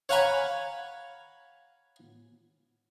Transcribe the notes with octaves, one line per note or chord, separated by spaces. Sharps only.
C#5 F5 F#5 G#5 A#5 B5